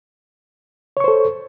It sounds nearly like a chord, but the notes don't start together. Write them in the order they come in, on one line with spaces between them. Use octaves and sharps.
C#5 C#6 C5 A4